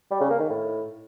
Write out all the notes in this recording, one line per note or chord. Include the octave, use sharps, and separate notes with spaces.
G3
C#3
A#3
D#3
A2